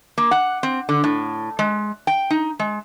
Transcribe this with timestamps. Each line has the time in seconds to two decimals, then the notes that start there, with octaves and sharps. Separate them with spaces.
0.18 A#3
0.31 F#5
0.63 C4
0.89 D3
1.04 A2
1.59 G#3
2.07 G5
2.30 D#4
2.59 G#3